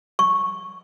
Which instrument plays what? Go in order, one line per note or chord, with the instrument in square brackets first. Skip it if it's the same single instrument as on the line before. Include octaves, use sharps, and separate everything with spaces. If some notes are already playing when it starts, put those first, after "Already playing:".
[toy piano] C#6